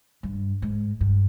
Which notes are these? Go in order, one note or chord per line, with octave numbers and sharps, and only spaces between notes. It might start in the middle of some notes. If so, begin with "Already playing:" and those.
G2
G#2
G2